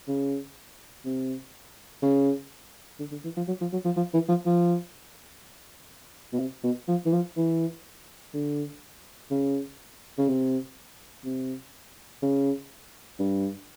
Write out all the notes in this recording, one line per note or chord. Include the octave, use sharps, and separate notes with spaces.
C#3
C3
C#3
D3
D3
E3
F3
F#3
F3
F#3
F3
F3
E3
F3
F3
B2
C3
B2
F3
E3
F3
E3
D3
C#3
C#3
C3
C3
C#3
G2